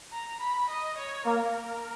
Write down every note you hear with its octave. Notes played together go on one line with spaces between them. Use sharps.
A#5
B5
D#5
C#5
A#3 A#4